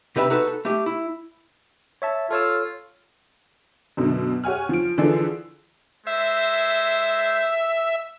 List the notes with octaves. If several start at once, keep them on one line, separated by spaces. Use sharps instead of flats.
C3 G4 B4 E5 A#5 B5
D#4 F#4 A4 B4
A4
A3 G4
E4
C#5 E5 A5
F4 A4 C#5 E6
F#2 B2 D3
G4 C#5 F#5 G#5 F6
F3 D7
D3 E3 F3 G#4 A4 D5
G#3 C5 E5